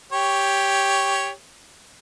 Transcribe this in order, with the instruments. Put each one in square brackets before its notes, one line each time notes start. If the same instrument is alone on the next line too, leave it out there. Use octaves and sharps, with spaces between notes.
[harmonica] G4 C#5